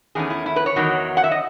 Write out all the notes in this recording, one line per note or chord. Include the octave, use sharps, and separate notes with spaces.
E2 D#3 A3 C#4 G#4
E4
E4
B4
C#5
E2 D#3 F#3
F#5
E5
D#5